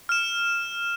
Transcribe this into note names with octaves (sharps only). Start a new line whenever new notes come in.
F6 E7